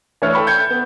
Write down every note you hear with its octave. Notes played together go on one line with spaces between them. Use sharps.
E3 A3 D4 B4 C#5 F6
A4 G5 B5 C#6
G6 G#6 C#7
B3